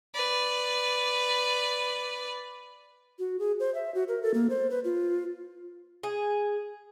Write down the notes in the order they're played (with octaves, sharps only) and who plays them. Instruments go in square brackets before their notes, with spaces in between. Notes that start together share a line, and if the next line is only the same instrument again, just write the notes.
[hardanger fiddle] B4 D5
[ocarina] F#4
G#4
C5
E5
F#4
A#4
A4
A#3
C5
B4
F4
[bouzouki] G#4